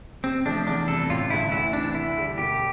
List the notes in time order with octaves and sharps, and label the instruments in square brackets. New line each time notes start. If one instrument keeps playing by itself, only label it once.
[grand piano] C3 [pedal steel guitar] C4
[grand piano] F3 A3 [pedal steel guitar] D4
[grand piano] E2 [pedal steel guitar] D4
[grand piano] C3 G3 [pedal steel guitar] A4
[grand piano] A1 [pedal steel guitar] F4
[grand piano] G2 D3 [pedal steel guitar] E4
[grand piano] D2 [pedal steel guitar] E4
[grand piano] C3 E3 [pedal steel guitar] D4
[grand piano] D2 [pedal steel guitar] E4
[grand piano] D3 G3
[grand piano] E1 [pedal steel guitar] G4